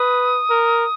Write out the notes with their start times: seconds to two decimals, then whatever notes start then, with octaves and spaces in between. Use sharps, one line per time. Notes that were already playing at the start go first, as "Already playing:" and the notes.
Already playing: B4 D#6
0.50 A#4